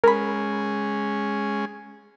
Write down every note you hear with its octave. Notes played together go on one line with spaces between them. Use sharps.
G#3 C#4 G#4 A#4 B5